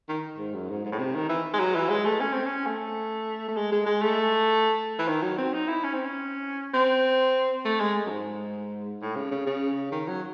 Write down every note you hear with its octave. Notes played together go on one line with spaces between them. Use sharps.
D#3
G#2
F#2
G#2
G#2
A2
C3
D#3
E3
G#3
F#3
E3
G#3
A3
C#4
C4
C#4
A3
A3
G#3
G#3
G#3
A3
E3
D#3
F#3
C4
D#4
E4
C#4
C4
C#4
C4
A3
G#3
F#2
G#2
A2
C#3
C#3
C#3
D#3
F#3